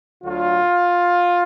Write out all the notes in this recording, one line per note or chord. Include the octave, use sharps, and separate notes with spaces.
D2 D3 F#3 F4